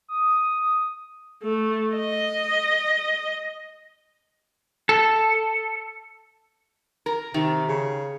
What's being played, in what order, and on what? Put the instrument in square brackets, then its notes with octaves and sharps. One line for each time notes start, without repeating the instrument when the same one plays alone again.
[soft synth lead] D#6
[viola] A3
D#5
[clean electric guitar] A4
[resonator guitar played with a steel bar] A#4
[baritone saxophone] C3 [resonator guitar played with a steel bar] D#3
[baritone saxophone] C#3